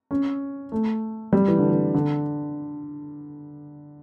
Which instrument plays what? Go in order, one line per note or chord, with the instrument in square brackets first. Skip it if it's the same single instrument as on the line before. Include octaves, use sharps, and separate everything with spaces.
[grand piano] C#4
A3
G3
E3
D3
E3
D3